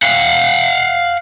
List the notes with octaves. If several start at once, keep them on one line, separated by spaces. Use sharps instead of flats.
F5 F#5